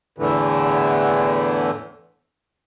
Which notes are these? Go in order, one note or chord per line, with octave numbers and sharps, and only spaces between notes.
E2 A2 D3 E3